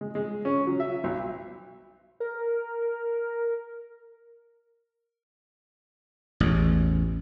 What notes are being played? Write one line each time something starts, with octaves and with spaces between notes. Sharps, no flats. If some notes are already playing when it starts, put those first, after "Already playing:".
G#3
G#3
C#4
F#3
E5
B1
A#4
A1 E2